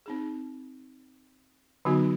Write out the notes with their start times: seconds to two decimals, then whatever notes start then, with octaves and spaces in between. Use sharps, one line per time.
0.06 C4 D#4 G#4
1.85 D3 F#3 B3 D#4 F#4